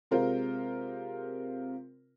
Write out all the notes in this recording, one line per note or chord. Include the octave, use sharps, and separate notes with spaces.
C3 G#3 F4 A#4 C5